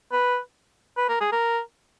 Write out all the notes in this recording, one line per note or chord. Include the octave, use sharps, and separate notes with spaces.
B4
B4
A#4
G#4
A#4